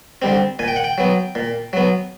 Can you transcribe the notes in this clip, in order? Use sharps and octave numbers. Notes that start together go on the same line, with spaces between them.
D3 G3 C4
A#2 G#5
G5
F#5
G5
F#3 B3
A#2
F#3 B3